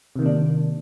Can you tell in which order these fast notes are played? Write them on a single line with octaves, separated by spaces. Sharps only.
C3 D#3 A#3 D4